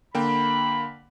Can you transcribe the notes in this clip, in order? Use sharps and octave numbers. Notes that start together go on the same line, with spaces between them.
D3 A#3 G5 B5